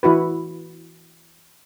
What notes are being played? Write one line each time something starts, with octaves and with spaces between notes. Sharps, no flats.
E3 E4 F#4 B4